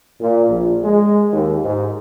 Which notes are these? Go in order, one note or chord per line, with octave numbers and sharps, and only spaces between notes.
A#2
A#1
G#3
D#2
G#2